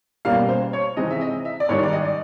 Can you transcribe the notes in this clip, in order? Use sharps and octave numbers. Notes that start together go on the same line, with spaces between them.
B2 G3 A#3 C#4 F5
C5
C#5
C3 E3 G#3 C4 D#4 D#5
E5
D#5
E5
D5
G#2 D#3 G3 C#5
D5
D#5
D5